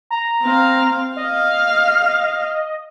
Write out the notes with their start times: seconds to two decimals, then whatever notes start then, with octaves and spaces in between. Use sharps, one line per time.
0.11 A#5
0.42 C4 F5
1.17 D#5 F5